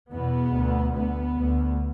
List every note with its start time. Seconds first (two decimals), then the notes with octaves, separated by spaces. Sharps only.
0.12 E2 B2 B3
0.54 D2
0.95 D2 B3
1.37 D2